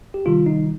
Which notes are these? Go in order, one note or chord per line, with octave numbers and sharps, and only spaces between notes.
G4
C3 D#3 G3 F4
D#4